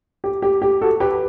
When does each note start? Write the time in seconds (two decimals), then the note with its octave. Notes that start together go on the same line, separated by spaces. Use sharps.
0.24 G4
0.42 G4
0.62 G4
0.82 F#4 A4
1.00 G4 B4